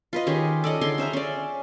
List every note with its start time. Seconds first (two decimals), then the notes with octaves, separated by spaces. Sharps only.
0.13 F4 B4 D#5
0.27 D#3 C#4 G4 G#4
0.64 A4 D5 D#5
0.81 D3 D#4 G#4 C6
0.98 C#4 C5 E5 A#5
1.13 C#4 D5